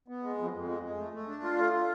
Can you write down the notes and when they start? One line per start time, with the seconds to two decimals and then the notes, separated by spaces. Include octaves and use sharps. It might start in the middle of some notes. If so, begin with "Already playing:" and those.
0.08 B3
0.23 G#3
0.37 F2
0.53 F2
0.68 G#3
0.83 G#3
0.98 A3
1.13 A3
1.28 D4
1.43 F4
1.58 A3
1.73 F4